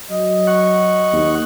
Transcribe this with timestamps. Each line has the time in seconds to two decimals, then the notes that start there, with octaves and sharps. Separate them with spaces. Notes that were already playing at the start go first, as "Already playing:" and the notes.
0.10 F#3 D#5
0.47 F#5 C#6
1.12 D#2